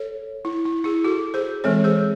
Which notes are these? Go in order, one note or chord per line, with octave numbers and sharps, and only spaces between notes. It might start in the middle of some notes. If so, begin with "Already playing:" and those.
Already playing: A4 C#5
E4
E4
E4 G#4
F#4 A4
G#4 C5
E3 G#3 C4 A4 C#5
G#4 C5